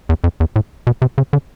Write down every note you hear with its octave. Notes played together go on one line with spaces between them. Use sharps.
E2
F2
E2
A2
B2
C3
C#3
D3